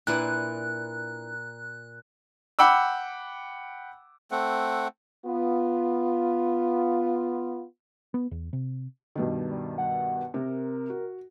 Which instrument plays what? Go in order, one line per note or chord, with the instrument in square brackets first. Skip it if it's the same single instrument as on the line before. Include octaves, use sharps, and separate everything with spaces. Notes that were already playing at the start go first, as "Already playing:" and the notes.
[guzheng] A#2 [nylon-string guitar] D4 E4 B4 [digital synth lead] F#6
[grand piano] F#5 G5 B5 D6 E6
[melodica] A3 C4 F#5
[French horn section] B3 F4
[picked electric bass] B3
E2
C3
[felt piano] G2 B2 D#3
[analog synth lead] G3
F#5
[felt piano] C3 [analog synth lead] A#4
[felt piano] F#4